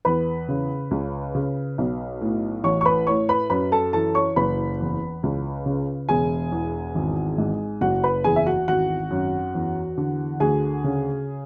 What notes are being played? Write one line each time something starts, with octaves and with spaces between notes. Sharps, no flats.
E2 B4 B5
C#3
C#2
C#3
B1
A2
A1 C#5 C#6
C#6
B4 B5
A2 C#5 C#6
B4 B5
F#2 B4 B5
A4 A5
E3 A4 A5
C#5 C#6
F#1 B4 B5
E2
C#2
C#3
E1 G#4 G#5
E2
G#1
G#2
F#1 F#4 F#5
B4 B5
E2 G#4 G#5
E5
F#4 F#5
G#1 F#4 F#5
F#2
E2
D3
D2 G#4 G#5
C#3